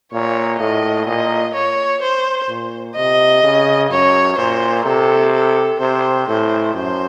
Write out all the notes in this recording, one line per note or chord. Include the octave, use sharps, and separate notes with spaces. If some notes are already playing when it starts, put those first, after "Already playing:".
A#2 C#5
A2 D#5
A#2 D#5
C#5
C5
A#2
C3 D#5
C#3
F#2 C#5
A#2 C5
C3 A4
A4
C3 C5
A2 C5
F#2 C5